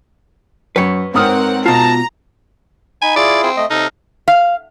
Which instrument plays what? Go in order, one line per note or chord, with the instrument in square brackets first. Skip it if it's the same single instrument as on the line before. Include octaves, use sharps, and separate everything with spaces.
[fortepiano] F#2 [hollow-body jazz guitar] B4 C#5
[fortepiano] G#2 D#6 F6 [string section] C4 A#4 F#5
[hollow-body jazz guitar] B2 F4 [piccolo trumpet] A5 [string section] A#5
[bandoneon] D#4 B5 [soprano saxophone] G#5
[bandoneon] E4 F4 G#4 [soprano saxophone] D5
[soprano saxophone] C4
[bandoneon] A3 D#5
[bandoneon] C3 A4 F6 [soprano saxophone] D#4
[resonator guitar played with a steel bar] F5